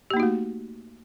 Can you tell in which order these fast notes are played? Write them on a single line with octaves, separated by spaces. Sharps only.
G4 A#3 D#4 F#4 A3